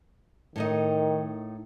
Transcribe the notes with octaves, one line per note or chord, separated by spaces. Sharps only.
A2 D#3 D#4 D#5